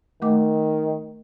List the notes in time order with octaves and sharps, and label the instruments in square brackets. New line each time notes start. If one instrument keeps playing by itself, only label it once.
[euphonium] D#3 [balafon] A3 D6